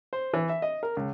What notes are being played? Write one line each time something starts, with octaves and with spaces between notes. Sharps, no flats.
C5
E3
E5
D#5
A#4
C#2